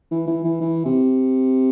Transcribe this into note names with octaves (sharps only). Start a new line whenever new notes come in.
E3
E3
E3
E3
C3